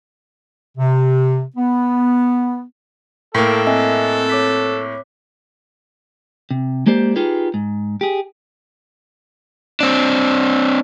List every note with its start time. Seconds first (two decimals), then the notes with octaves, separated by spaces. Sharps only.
0.78 C3
1.57 B3
3.35 A2 A#3 A4 A#4 G5
3.67 C4 D#5 E5 G#5 F#6
4.29 C#5 D6 B6
6.51 C3
6.86 G#3 A#3 G4 C5 D5
7.16 D#4 F4 G4 G#4 B4
7.54 G#2
8.01 G4 G#4
9.81 C4 D4